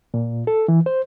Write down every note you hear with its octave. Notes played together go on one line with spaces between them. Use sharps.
A#2
A4
E3
C5